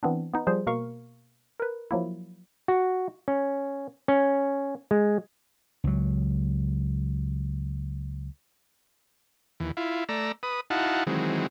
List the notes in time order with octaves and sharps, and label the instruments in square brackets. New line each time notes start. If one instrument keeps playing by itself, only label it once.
[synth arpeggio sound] E3 B3 C4 D4
B3 D#4
F3 G3 G#4 C5
B2 A#3 A#4 F5 C#6
A#4 B4
F3 F#3 A#3 E4
[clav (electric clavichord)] F#4
C#4
C#4
G#3
[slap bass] C#2 F#3
[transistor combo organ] D#2 E3
E4 F4
A3 D5 A#5 E6
B4 D#6
D#4 E4 F#4 F5 F#5 A5
D#3 E3 F#3 G#3 C4